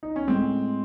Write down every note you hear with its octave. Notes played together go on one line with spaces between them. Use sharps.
D#4
C#4
A2 G#3 C4